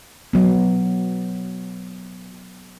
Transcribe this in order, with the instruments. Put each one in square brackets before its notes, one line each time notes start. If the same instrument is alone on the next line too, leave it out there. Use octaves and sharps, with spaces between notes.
[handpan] F#3 B3